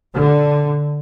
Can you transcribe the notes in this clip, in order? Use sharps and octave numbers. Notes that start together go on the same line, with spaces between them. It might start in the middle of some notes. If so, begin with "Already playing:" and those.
D3